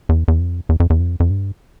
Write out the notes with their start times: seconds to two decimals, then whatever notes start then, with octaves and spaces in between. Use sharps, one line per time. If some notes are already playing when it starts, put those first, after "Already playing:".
0.09 E2
0.28 E2
0.40 F2
0.69 E2
0.80 F2
0.90 E2
1.00 F2
1.20 F2
1.30 G2